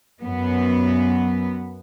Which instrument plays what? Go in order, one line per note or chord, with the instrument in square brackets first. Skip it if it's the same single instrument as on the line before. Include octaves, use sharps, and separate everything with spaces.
[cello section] F#2 B3